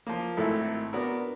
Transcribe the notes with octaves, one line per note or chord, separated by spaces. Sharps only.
F3 A#3
G#1 A2 E4 A4
B3 D4 F#4 A#4